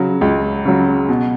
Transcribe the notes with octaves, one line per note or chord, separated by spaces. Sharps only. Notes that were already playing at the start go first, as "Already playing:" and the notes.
Already playing: C#3 F#3
C#2
C#3 F#3
B2